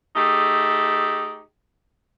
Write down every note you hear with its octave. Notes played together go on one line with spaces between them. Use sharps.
A3 D#4 G4 G#4